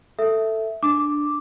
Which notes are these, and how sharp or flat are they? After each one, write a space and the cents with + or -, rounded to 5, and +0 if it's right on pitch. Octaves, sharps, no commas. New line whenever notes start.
A4 +10 E5 +0
D4 +5 D6 +0